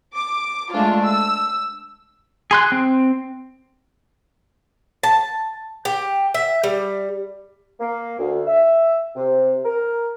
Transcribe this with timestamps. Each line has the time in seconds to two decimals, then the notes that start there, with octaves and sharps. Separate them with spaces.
0.15 D6
0.72 G#3 A3 D4 F4
1.04 E6
2.51 G#4 C6 F#6
2.72 C4
5.03 A5
5.85 G4
6.34 E5
6.64 G3
7.80 A#3
8.19 D2
8.47 E5
9.16 C3
9.65 A#4